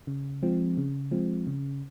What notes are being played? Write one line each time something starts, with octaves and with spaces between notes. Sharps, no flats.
C#3
F3 G#3 C4
C#3
F3 G#3 C4
C#3